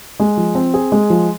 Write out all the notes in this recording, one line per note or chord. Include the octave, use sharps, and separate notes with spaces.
G#3
F3
C4
G#4
G#3
F3